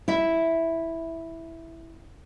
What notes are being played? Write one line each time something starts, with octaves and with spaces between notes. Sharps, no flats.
E4 E5